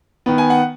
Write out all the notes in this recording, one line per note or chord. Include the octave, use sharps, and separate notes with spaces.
D#3 B3
G#5
F#5